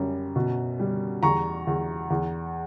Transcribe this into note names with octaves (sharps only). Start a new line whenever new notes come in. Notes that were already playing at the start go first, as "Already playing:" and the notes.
Already playing: F#2 G3
B2
G3
E2 A#5 C#6
E2
E2